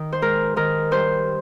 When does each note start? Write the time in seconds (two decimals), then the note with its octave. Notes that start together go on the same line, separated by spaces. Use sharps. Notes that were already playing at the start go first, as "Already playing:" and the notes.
Already playing: D#3
0.12 C5
0.22 G#2 A#4
0.56 D#3 A#4
0.91 G2 C5